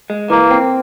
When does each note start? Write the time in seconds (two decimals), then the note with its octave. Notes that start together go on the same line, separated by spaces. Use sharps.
0.10 G#3
0.30 E3 A#3
0.51 C4